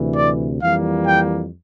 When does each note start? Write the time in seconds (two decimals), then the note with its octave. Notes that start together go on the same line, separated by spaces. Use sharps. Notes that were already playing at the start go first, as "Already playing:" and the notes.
Already playing: D2 C3 E3
0.15 D5
0.61 F2 E3 G3 A#3 F5
1.06 G5